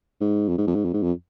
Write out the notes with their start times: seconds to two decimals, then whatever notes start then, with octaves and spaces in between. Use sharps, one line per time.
0.21 G#2
0.49 F2
0.58 G#2
0.67 F2
0.76 G#2
0.85 F2
0.93 G#2
1.03 F2